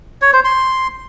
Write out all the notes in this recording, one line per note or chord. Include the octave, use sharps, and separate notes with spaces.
C#5
C5
C6